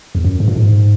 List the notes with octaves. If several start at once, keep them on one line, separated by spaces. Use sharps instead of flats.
E2
F#2
G#2
A#2
G#2